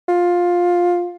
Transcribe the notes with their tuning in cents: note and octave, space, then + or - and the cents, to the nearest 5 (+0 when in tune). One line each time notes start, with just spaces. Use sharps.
F4 +15